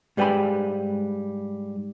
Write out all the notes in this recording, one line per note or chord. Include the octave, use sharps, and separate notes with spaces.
G#2 G3 B4 G5 G#5 B5